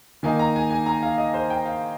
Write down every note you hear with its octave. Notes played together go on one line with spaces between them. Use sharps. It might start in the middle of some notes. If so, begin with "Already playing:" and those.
D#3 A#3 D#4 G#5
A#5
G#5
G#5
A#5
F5
D#5
C5
G5
F5